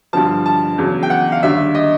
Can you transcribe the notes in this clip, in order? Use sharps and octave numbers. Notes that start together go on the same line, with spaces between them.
G2 D3 F3 A5
A5
E2 C#3 F#3
G5
F#5
F5
D#2 D3 G3 E5
D#5